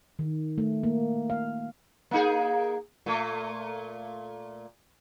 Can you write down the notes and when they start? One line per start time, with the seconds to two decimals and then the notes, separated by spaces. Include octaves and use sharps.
0.19 D#3
0.58 A3
0.83 A#3
1.30 F5
2.11 A#3 D#4 G#4
3.06 A#2 A3